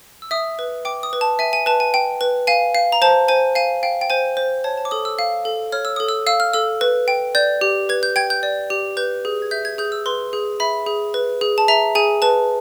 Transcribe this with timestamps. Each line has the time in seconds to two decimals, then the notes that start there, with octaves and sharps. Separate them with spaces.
0.22 E6
0.31 E5 D#6
0.59 B4
0.85 G5 D6
1.03 D#6
1.13 B4
1.21 A5
1.39 E5 G#5
1.53 G#5
1.66 B4 A5
1.80 G#5
1.94 G5
2.21 B4
2.47 F5 G#5
2.75 F5
2.92 A#5
3.02 C5 A5
3.28 C5 G#5
3.55 F5 G#5
3.83 F5 G5
4.01 G5
4.10 C5 G#5
4.37 C5
4.64 C#5 A5
4.78 A5
4.85 D6
4.91 A4 D#6
5.05 E6
5.19 F5
5.45 A4
5.72 C#5 F6
5.85 E6
5.96 A4 D#6
6.08 E6
6.27 F5 E6
6.40 F6
6.53 A4 E6
6.81 B4
7.08 G5
7.35 D5 G6
7.61 G4
7.89 B4 G#6
8.03 G6
8.16 G5 G#6
8.30 G6
8.43 D5
8.70 G4
8.97 B4 G6
9.25 G#4
9.42 G#6
9.51 E5 G6
9.65 G#6
9.78 G#4 G6
9.92 E6
10.06 B4 C6
10.33 G#4
10.60 E5 B5
10.86 G#4
11.14 B4
11.41 G#4
11.58 A5
11.68 E5 A#5
11.95 G#4 G#5
12.22 B4 A5